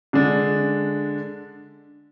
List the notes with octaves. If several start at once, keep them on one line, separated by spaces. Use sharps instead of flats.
D3 G#3 D4